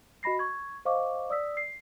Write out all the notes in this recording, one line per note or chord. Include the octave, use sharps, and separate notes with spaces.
F#4 D#5 B5 A#6 C7
C#6 G#6
C5 D#5 F5 C#6 D6
D5 D#6 E6 B6
C7